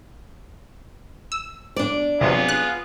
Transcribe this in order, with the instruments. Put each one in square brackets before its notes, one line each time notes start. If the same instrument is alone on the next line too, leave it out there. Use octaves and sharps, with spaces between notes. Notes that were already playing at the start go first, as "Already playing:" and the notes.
[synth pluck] E6
[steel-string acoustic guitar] D4 D5
[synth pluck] C3 F#3 [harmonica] B3 F4 G#4
[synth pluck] F#6